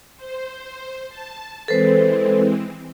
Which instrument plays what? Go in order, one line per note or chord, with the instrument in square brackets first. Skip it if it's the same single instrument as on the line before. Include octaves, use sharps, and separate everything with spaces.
[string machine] C5
A5
[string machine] E3 G#3 C4 [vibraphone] A4 B4 C5